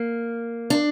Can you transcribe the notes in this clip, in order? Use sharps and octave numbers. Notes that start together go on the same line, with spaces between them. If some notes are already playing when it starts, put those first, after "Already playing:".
Already playing: A#3
D4